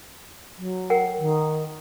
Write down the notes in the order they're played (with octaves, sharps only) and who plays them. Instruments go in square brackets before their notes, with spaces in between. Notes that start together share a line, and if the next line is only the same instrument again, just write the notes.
[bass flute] F#3
[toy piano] A#4 F#5 G5
[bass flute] D#3